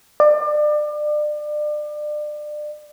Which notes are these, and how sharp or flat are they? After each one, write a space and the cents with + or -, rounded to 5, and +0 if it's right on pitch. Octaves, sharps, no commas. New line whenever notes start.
D5 +30